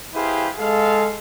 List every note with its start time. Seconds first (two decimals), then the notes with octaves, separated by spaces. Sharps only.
0.14 E4 G4 G#4 B4 C5 F5
0.59 G#3 A4 F5